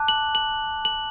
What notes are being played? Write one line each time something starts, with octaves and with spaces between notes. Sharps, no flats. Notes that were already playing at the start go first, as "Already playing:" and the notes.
Already playing: A5 D6 F#6
F#7
F#7
F#7